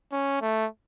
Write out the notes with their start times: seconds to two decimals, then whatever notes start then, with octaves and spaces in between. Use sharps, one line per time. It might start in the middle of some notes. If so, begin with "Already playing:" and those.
0.12 C#4
0.41 A3